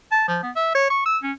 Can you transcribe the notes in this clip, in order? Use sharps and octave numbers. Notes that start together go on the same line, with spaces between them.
A5
F3
B3
E5
C#5
C#6
E6
C#4